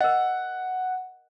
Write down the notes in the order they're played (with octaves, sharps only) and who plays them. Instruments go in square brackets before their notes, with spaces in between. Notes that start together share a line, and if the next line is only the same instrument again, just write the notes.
[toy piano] A#4 D#5 [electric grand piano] F#5